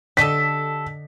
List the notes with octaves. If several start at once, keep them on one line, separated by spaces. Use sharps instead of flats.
D3 G4 A4 D#5 A5 B6